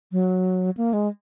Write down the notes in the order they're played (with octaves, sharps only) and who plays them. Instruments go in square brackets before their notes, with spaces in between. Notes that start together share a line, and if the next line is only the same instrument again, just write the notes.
[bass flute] F#3
A#3
G#3